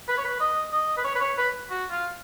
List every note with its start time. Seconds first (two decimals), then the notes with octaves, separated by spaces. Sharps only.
0.08 B4
0.18 C#5
0.24 B4
0.40 D#5
0.72 D#5
0.97 B4
1.04 C#5
1.15 B4
1.21 C#5
1.38 B4
1.70 F#4
1.90 F4